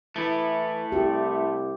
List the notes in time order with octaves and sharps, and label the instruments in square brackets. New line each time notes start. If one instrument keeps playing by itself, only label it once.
[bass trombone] E3 [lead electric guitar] A3 E4
[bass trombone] C2 [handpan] G4